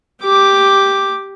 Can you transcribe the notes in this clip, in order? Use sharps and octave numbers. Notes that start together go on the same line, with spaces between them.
G4 D6